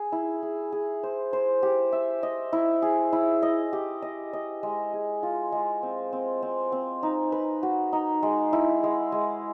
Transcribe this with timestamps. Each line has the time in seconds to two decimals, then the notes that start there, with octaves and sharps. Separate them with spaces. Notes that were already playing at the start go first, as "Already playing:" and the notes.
Already playing: G#4
0.12 E4
0.43 G#4
0.72 G#4
1.03 C5
1.33 C5
1.63 G4
1.92 E5
2.23 D#5
2.53 E4
2.82 G#4
3.13 E4
3.43 D#5
3.73 G4
4.02 D#5
4.33 D#5
4.63 G#3
4.93 G#4
5.23 F4
5.52 G#3
5.83 C4
6.13 C4
6.43 C4
6.72 C4
7.03 D#4
7.32 B4
7.63 F#4
7.93 D#4
8.23 G#3
8.53 E4
8.83 G#3
9.12 G#3